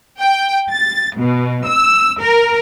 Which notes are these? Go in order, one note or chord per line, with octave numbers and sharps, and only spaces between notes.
G5
A6
B2
E6
A#4